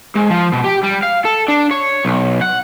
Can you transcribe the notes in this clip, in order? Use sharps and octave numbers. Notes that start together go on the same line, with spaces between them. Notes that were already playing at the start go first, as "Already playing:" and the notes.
G#2
F3
B2
G4
G3
F5
A4
D4
C#5
B1
F#5